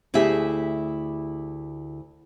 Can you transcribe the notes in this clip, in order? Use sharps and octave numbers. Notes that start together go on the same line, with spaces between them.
D2 E4 G4 G#4 E5